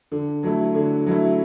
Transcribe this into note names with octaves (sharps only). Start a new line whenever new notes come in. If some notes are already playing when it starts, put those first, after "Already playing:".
D3
F#3 A3 E4
D3
F#3 A3 E4